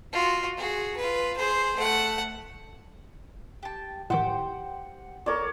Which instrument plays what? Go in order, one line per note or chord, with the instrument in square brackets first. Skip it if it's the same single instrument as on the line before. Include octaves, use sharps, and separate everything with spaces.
[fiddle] F4 F#4
F#4 G#4
F4 B4
G#4 C5
A3 F#5
[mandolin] G4 A5
[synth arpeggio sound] A2 D#3 [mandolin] G4 C5 [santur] F#5
[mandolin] A4 [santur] A#4 C#5 D5